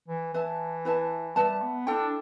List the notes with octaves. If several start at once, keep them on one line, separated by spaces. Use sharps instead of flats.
E3
E3 B4 E5 A5
E4 B4 E5 A5
G3 B4 E5 A5
B3
D4 E4 A4 G5